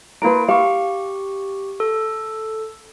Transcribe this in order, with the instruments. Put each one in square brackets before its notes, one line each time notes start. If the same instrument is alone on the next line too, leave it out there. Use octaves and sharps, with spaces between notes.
[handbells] A#3 E4 D7 [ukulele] A#4 B4
[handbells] G4 C#6 [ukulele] F5
[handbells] A4